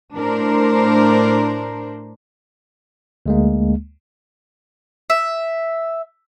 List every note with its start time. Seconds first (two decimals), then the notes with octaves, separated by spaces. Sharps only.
0.16 A2 D4 A#4 C5
3.26 D2 G#3 A#3
5.10 E5